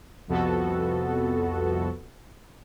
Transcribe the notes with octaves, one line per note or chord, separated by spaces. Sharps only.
C2 F2 C3 B3 F#4 A4